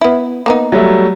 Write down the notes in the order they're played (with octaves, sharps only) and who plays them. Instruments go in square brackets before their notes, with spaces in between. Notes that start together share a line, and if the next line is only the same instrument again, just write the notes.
[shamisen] B3 E4
A#3 B3 D#4
[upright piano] F#3 G3 A3